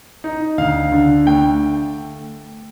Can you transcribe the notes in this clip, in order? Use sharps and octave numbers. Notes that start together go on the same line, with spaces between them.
D#4
D2 F5
D3
A3 G5